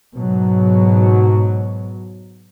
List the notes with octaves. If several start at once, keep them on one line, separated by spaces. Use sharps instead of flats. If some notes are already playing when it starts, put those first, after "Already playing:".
G#2 B2 F#3